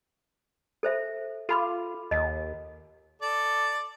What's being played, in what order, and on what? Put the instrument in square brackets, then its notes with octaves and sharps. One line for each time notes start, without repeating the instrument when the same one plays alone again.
[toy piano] A4 C5 E5
[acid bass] F4 [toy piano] A4 B5 D6
[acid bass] D#2 [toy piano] D#5
[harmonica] A4 D5